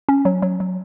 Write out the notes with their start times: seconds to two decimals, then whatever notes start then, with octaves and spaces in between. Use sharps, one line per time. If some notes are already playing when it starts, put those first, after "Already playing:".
0.09 C#4
0.25 F#3
0.42 F#3
0.60 F#3